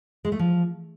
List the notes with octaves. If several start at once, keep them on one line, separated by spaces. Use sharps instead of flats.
G#3
A3
F3